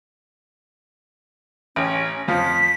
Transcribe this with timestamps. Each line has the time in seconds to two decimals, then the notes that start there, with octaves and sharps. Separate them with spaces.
1.76 A1 C#4
2.28 F2 F3 F5 B6